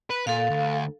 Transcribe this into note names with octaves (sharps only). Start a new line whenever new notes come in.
B4
A#2 A4 F5
D2